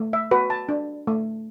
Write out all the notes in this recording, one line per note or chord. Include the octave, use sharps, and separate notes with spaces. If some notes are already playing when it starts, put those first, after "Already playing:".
Already playing: A3
E5
F#4 B4
A5
D4
A3